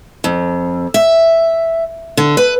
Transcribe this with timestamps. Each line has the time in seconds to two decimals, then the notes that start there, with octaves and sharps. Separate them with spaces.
0.24 F2
0.94 E5
2.17 D3
2.37 B4